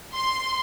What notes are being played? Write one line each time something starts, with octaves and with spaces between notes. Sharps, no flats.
C6